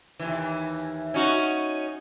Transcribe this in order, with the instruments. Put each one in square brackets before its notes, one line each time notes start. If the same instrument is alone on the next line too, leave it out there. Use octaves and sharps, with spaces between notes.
[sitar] D#2 E3
C#4 D#4 F#4